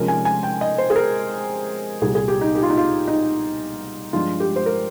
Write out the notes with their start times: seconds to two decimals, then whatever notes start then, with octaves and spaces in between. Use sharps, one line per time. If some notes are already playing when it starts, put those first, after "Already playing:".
Already playing: C3 F3 G#3 C#4 A#4
0.08 G#5
0.25 G#5
0.43 G5
0.61 D#5
0.78 C5
0.90 G#4
0.96 A#4
2.02 C2 A#2 G3 G#4
2.15 G#4
2.28 G4
2.41 D#4
2.55 G4
2.63 F4
2.70 D#4
2.77 F4
3.07 D#4
4.13 G2 F3 G#3 F4
4.40 G4
4.56 C5
4.66 A#4